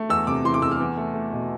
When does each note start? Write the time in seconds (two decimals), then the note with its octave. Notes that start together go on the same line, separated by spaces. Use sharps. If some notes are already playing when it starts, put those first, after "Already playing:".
Already playing: A3
0.09 E2 E6
0.27 C3 D6
0.44 E3 C6
0.54 D6
0.62 C3 E6
0.72 F6
0.80 E2
0.97 A3
1.14 A3
1.33 B2